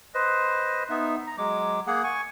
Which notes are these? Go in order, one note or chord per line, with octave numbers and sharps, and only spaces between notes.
B4 C5 D#5
B3 D#4 E5
A#5
F#3 G#3 D6
A#3 G#4 F#5
G#5 C#6